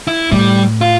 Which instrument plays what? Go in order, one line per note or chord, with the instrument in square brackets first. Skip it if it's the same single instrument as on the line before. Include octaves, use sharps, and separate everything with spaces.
[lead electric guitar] E4
[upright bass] A2 [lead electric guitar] G3
[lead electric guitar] F4